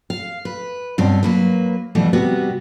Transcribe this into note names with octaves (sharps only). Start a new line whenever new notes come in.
F5
B4
G2 B2 C4 C#4
F#3 A#3 B4
F2 B2 E3 G3 A3
C3 G3 B3 F#4 G4